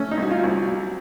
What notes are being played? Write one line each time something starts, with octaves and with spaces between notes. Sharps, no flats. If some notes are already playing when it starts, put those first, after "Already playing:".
Already playing: A3 C#4
D#4
C2 F#4
F4
C2
F#4
F#3